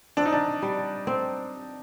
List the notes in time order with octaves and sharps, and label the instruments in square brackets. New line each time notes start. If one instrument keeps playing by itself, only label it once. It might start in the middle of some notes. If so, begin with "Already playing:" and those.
[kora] C4 [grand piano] D4
[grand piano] D#4
D4
[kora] G3
C4